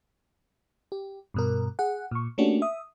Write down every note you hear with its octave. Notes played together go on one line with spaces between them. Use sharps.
G4
G2 B2 A#4
G#4 F#5
A#2 C#6
A3 A#3 C#4 D4 F#4 G4
E5 D#6